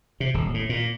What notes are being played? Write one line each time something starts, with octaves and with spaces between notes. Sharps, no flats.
C3
D#1
A2
A#2